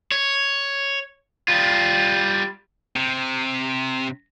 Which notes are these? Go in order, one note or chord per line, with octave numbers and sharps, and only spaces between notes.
C#5
G3 F4
C3